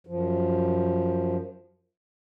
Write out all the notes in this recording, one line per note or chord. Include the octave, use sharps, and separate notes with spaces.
F#2 F3